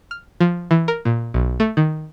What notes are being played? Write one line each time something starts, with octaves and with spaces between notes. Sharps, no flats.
F6
F3
E3
A#4
A#2
B1
A3
D#3